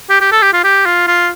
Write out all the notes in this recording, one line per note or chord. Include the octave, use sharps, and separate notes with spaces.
G4
G4
A4
G4
F4
G4
F4
F4